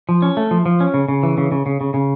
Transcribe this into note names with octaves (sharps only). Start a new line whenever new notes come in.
F3
C#4
A3
F3
F3
C#4
C#3
C#3
E3
C#3
C#3
C#3
C#3
C#3